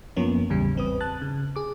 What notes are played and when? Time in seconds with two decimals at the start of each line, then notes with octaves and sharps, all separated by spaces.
0.17 F#2 F3 A#3 B3 C#4
0.50 A1 E2 C#3 G3
0.75 G#1 E2 C4 B4 D#6
1.01 A5 F#6 A6
1.22 C#3
1.56 G#4 D6